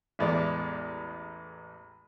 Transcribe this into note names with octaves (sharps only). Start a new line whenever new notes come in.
A1 E2 G#3 D5